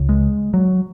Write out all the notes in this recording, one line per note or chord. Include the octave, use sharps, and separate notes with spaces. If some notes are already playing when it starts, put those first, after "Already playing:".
Already playing: C#2 C#3
G#3
F#3